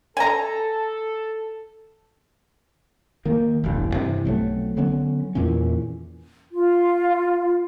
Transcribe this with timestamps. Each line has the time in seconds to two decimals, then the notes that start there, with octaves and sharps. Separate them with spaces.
0.17 A4 G#5 A#5
3.25 D#3 A#3
3.64 E1 A1 G2
3.94 G2 C3 E3
4.25 B1 F#3 A3 C4
4.77 D3 F#3 B3 C#4
5.35 E2 A#2 E3 C#4
6.53 F4